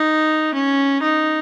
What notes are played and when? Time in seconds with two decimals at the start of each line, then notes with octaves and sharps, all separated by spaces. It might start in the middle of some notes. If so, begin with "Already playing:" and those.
Already playing: D#4
0.54 C#4
1.03 D#4